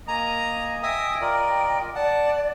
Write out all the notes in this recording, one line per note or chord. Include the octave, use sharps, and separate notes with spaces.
A#3 D#5 G#5 A#5
E5 G5 G#5 D#6
F4 A#4 D5
D5 F#5 A5